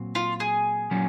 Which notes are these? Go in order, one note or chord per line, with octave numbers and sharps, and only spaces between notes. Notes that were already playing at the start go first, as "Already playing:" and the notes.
Already playing: A#2 F#3 C4
F4
G#4
A#2 F#3 C#4